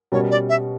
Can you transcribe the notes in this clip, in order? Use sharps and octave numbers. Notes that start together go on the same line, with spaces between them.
B2 G3 C#4 F#4 A#4 C#5
D5
E5